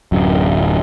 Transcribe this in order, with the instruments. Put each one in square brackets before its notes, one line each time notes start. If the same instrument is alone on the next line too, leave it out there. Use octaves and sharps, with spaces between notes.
[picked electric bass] D1 F#2